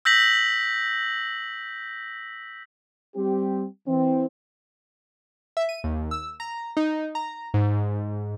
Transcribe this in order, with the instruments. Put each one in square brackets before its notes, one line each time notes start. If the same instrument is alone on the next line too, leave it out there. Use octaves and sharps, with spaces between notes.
[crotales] E6 G6 A#6 B6 F#7
[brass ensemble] G3 C4 G4
E3 C4
[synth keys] E5
D#7
D#2
E6
A#5
D#4
A#5
G#2